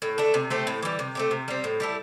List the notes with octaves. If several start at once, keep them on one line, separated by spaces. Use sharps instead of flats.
A2
A3 D4
C3
A3 C4 G4
A2
E3 G3
C3
A3 C4 G4
C3
G3 C4
A2
G3 E4 A4